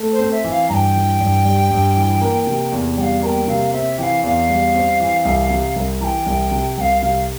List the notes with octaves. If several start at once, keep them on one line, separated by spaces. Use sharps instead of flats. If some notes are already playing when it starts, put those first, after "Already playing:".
Already playing: A3
C5
C4
E5
E3
F5
G2 G5 A#5
E3
G2
G3
G2
E3
A#3
C3
E2
G3 F5 G5
A#3 G5 A#5
C3 F5
C4 E5
E3 F5 G5
E2 F5
G3
C4
E3
C2
C3
C2
E3 G5 A#5
C2
C3
C2 F5 G5
C3 F5